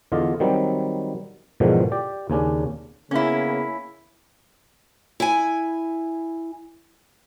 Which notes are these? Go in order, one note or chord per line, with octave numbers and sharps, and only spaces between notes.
E2 D3 F4 D5 D#5
D#3 F#3 G3 C4
E2 G#2 B2 D3 D#3 F3
G4 D5
D#2 C#3 C#4 D4
C#3 A#3 B3 C#4 E4
E4 G#5